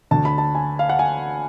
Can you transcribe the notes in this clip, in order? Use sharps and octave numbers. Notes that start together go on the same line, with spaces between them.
D2 D3 A5
B5
A5
G#5
F5
F#5
G#5